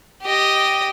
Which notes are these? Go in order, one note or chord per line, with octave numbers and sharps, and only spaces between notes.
G4 D#5